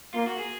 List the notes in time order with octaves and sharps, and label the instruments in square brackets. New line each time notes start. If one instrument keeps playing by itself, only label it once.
[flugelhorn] A#3 [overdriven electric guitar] F4
[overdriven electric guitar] F#4
G#4